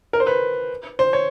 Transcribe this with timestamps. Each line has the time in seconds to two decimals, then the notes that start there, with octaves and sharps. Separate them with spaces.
0.13 A#4
0.20 C5
0.27 B4
0.99 C5
1.13 C#5